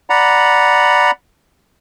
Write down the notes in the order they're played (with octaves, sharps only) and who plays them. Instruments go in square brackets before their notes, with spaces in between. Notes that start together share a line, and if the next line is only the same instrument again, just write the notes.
[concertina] D5 F#5 A#5 B5